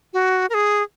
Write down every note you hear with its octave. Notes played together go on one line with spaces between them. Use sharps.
F#4
A#4
G#4